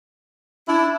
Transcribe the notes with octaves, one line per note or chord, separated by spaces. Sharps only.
D4 E4